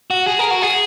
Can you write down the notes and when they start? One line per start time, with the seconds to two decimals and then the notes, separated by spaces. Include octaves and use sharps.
0.10 F#4
0.27 G#4
0.39 A#4
0.51 F#4
0.62 G#4